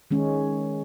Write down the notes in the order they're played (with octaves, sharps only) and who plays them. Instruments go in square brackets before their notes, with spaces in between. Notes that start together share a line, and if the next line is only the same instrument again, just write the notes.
[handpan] D#3 G#3 C#4